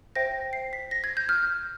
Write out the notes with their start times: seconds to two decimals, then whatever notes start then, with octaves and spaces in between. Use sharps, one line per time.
0.15 C5 E5 G5 A#6
0.53 C7
0.73 B6
0.91 A#6
1.04 G#6
1.17 G6
1.29 F6